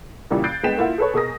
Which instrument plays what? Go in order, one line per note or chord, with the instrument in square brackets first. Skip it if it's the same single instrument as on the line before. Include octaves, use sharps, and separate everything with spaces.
[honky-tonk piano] A#2 C#3 E3 G3
F#6 G6 A6 C7 D7
G2 G#3 B3 G5 B6 E7
A#3 E4 F4 F#5
G#4 A4 B4 C#5
B2 G#4 A#4 D#6 A#6